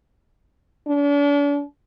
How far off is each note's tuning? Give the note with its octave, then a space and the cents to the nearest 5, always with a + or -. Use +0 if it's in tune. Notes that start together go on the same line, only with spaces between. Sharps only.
D4 -40